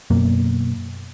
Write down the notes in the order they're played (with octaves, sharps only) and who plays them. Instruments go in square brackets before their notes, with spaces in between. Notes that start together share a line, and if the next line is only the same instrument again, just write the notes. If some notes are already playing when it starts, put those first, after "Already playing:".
[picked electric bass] F#2 B2 A#3